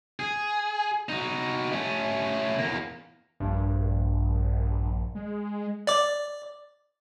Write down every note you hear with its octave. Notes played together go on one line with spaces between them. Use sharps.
G#4
D#4 F#4
A3 C#4
E2 A#3
A#1 G2
G#3
D5 D6